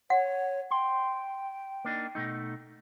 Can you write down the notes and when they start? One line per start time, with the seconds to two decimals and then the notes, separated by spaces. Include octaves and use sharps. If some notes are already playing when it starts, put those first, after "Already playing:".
0.10 C#5 F#5
0.71 G5 C6
1.85 A#3 D4 D#4
2.15 B2 A3 D#4